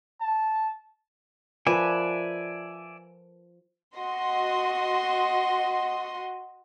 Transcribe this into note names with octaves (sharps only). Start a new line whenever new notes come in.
A5
F3 A#4 B4 D5 E5 G#5
F#4 D#5 C6